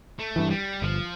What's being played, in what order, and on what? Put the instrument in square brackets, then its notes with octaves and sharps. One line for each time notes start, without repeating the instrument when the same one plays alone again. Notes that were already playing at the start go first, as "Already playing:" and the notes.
[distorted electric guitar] A3
[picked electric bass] G2 E3
[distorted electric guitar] G3
[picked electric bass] G1 [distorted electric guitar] F3